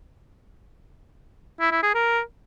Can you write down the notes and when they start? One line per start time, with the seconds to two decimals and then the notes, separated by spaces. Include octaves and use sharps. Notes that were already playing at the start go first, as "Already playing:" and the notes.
1.60 E4
1.71 E4
1.83 G#4
1.95 A#4